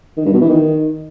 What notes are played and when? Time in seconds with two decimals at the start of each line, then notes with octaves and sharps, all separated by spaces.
0.17 D#3
0.25 G2
0.33 B2
0.41 E3
0.49 D#3